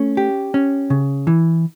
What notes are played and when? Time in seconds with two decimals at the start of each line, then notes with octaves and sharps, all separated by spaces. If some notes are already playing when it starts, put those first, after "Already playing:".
Already playing: A3 C#4
0.17 G4
0.54 C#4
0.90 C#3
1.27 E3